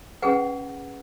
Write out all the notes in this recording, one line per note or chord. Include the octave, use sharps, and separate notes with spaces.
C#4 G#4 B4 F#5